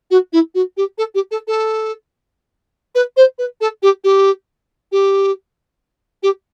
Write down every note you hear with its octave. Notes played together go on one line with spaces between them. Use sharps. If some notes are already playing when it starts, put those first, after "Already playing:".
F#4
E4
F#4
G4
A4
G4
A4
A4
B4
C5
B4
A4
G4
G4
G4
G4